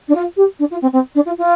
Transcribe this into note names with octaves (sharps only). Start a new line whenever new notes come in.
D4
F4
G4
D4
F4
C4
C4
D4
F4
F4